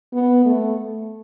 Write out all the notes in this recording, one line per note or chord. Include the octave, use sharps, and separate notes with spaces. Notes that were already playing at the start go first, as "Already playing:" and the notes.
B3
A3